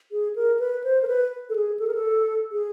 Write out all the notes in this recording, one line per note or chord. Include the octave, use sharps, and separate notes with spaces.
G#4
A#4
B4
C5
A#4
B4
A4
G#4
A4
A#4
A4
G#4